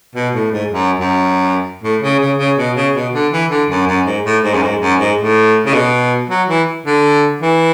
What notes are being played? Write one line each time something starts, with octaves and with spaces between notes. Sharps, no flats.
B2
A2
G#2
F#2
F#2
A2
C#3
C#3
C#3
B2
C#3
B2
D3
E3
D3
F#2
F#2
G#2
A2
G#2
F#2
G#2
F#2
G#2
A2
C#3
B2
F#3
E3
D3
E3